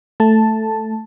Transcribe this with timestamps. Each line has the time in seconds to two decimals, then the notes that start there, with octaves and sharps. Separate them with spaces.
0.20 A3 A5